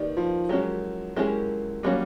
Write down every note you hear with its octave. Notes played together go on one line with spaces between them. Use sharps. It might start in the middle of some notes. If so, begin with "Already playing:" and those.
Already playing: D#3 A#3 D#4 G4 B4 D5
F3
F#3 G#3 C#4 E4 G4 A#4
G#3 C#4 E4 G4 A#4
D#3 F#3 G3 A#3 C#4 F#4